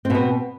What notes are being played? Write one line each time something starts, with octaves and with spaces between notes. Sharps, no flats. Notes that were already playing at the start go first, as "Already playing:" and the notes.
B2 B3 C4